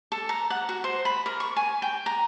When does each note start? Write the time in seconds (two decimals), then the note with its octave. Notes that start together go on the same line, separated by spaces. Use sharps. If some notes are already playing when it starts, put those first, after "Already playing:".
0.12 A4
0.29 A#5
0.50 F#5
0.69 F#4
0.84 C5
1.05 B5
1.26 A#4
1.40 C#6
1.56 G#5
1.82 G5
2.06 A#5